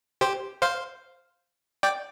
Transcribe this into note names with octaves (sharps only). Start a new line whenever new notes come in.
G4 C5
C5 F5
D5 G5